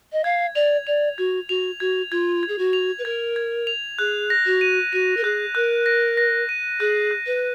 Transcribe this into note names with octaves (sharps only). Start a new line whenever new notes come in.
D#5
F5 G#6
D5 F7
D5 F7
F#4 G#6
F#4 F7
F#4 G#6
F4 G#6
G#6
G#4
F#4
F7
B4
A#4 G#6
G#6
F7
G#4 F#6
A#6
F#4
D#7
F#4 D#7
A#4
G#4 F#6
A#4 F#6
A#6
A#6
D#7
G#4 F#6
F#6
B4